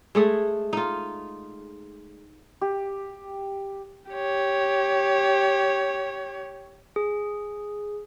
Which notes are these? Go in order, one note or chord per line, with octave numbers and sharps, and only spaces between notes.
G#3 A3 G#4
D#4 F4
G4
G4 C#5
G#4